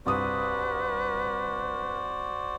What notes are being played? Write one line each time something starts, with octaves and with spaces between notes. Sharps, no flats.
C2 G2 F#4 B4 C5 D5 D#6